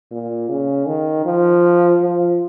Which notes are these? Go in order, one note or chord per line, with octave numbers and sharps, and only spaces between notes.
A#2
C#3
D#3
F3
F3